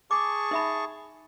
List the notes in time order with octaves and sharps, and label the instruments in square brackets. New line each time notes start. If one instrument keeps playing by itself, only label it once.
[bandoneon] G#4 A5 C#6 [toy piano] D6
[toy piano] D#4 E5 B5